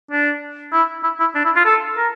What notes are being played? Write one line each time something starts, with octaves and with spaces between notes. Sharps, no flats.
D4
E4
E4
E4
D4
E4
F4
A4
A#4